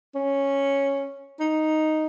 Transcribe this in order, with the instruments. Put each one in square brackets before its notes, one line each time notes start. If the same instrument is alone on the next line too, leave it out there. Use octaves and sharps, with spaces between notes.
[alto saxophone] C#4
D#4